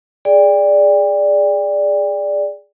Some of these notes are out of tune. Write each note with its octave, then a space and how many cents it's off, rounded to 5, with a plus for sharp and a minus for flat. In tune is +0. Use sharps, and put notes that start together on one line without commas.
G#4 +0 D5 +0 G5 +35